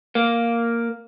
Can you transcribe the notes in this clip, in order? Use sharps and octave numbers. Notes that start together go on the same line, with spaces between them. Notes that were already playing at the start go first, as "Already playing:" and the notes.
A#3